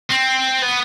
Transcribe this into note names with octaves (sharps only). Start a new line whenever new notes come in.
C4
B3